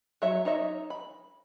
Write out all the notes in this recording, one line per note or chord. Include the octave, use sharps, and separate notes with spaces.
F#3 C#5 E5
D#4 C#5 D#5 E5
B5